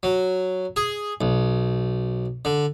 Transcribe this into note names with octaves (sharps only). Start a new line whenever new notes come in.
F#3
G#4
B1
D3